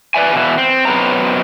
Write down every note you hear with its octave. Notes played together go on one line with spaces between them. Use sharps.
B4 D5 E5 G#5
B2 D#3 E3
C4
F#2 B2 B3 C4 A#5